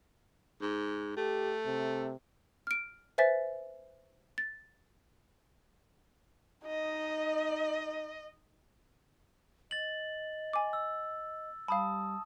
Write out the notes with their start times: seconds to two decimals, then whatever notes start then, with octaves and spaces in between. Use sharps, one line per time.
0.62 G#2
1.17 A3 G4
1.65 C3
2.67 F6 D7
3.18 B4 C5 E5 G#5 A6 B6
4.38 A6
6.67 D#4 D#5
9.71 D#5 A6 F#7
10.53 G#5 D6
10.73 E6
11.68 G3 F5 A5 B5 D#6